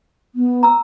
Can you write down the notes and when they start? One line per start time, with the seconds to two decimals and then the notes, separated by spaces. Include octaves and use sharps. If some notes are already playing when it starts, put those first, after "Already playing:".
0.35 B3
0.63 A#5 E6